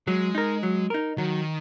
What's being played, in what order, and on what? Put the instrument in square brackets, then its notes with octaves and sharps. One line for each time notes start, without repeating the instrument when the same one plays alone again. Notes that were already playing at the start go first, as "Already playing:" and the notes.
[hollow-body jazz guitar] F#3 [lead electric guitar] G#3
[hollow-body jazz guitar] D#4 A#4
F#3
D#4 A#4
[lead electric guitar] D#3 [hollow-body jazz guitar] F#3